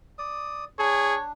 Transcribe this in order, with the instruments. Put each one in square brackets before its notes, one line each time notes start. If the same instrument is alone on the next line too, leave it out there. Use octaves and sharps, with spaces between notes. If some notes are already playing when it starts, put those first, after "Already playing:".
[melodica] D5 D#6
[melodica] D4 [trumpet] G#4 [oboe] C#5